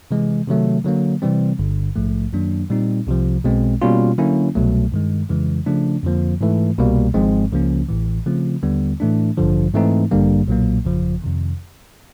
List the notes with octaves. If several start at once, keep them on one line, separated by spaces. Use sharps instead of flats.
C3 E3 G#3
C3 D#3 F#3 A3
D3 F#3 A#3
C3 E3 G3 C4
G1 G2 D3
A#1 G#2 F3 A3
F#2 D#3 F#3 A#3 D4
A#2 G3 C4 D#4
C2 C3 F3
B1 B2 G#3 C4
B2 G3 A#3 C#4 F4
D3 F#3 A#3 C#4 E4
C2 B2 F#3 A3
G2 D#3 G#3
F2 C#3 E3 G#3
C#3 F3 A3 D4
F2 D3 F3 A#3
G#2 E3 A3
C2 B2 G3 A#3
G#1 G#2 F3 G#3 C4
C#2 C#3 F3 A#3 C#4
A1 A2 E3
C#3 F3 A3 C4 F4
D#2 D3 G3 B3
A2 E3 A3 D4
A1 G2 D3 F3
G#2 E3 A3 C4 D#4
A1 G2 D3 G3 A#3
B1 A#2 F#3 A#3
G1 F2 C#3 F3
F2 C3 D#3